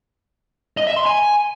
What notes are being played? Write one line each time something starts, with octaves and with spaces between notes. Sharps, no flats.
D#5
E5
C6
G#5